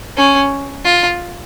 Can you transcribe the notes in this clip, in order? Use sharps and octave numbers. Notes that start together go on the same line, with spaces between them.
C#4
F4